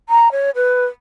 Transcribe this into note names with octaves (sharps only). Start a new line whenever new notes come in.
A#5
C#5
B4